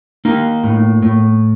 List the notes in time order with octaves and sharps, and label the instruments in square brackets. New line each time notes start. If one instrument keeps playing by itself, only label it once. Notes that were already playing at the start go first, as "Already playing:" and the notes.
[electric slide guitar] A#3 D#4
A2
A2